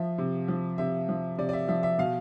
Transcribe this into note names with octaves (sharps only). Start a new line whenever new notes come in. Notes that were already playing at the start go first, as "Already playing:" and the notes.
Already playing: F3 E5
C3
F3
C3 E5
F3
C3 D5
D5
E5
F3 E5
E5
B2 F5